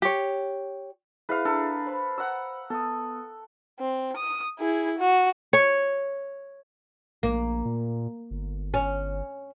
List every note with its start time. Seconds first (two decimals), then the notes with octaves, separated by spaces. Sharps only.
0.02 G4 C#5
1.29 E4 G#4 B4 E5 F5
1.45 D4 A4 A#5
1.87 C5 B5
2.18 F#5 A#5 E6
2.70 B3 A4 D#6
3.80 C4
4.17 D#6
4.59 E4 G#4
4.99 F#4
5.53 C#5
7.23 A#1 A#3
7.65 A#2
8.31 G1
8.74 C#4